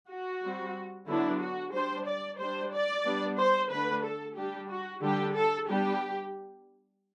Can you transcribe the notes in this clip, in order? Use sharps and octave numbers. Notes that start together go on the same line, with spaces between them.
F#4
G3 C4
D3 F#3 B3 D4 E4
F#4
G3 D4 C5
D5
G3 D4 C5
D5
G3 B3 D4
C5
D3 A3 D4 B4
A4
G3 D4 G4
F#4
D3 G3 D4 G4
A4
G3 B3 D4 G4